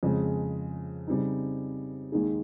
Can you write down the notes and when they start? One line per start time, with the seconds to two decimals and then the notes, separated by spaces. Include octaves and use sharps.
0.03 F2 C#3 G#3
1.07 C#3 G3 C4 D#4
2.12 D#2 D#3 G#3 D#4 G#4